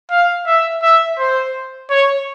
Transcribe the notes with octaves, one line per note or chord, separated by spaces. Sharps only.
F5
E5
E5
C5
C#5